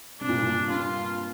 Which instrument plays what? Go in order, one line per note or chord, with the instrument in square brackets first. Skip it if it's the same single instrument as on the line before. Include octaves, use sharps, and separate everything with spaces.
[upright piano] C3 [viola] D4
[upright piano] A#2
G2
A#2
[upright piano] G2 [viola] F4